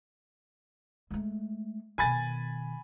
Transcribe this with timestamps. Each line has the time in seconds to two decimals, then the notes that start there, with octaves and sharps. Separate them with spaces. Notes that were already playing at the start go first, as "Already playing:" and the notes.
1.11 G#3 A3
1.98 B2 D#3 G#5 B5 A6